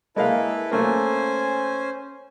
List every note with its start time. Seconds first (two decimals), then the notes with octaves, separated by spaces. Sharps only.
0.16 G#3 A#3 E4 A4 B4 F5
0.71 A3 A#3 C#4 C5 G#5